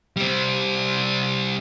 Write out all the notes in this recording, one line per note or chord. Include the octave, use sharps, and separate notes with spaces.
G3 C4